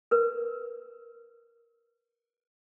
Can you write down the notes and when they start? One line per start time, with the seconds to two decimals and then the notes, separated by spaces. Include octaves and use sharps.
0.11 A#4 B4